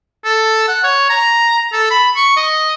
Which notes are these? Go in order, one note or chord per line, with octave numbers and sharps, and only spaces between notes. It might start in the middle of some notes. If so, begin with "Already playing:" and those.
A4
F#5
C#5
A#5
A4
B5
C#6
D#5